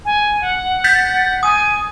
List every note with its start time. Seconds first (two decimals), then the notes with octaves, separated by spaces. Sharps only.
0.05 G#5
0.41 F#5
0.84 G6 A6 B6
1.43 G#5 D#6